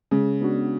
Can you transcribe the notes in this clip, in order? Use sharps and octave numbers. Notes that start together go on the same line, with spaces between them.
C#3 G#3
B3 D4 F#4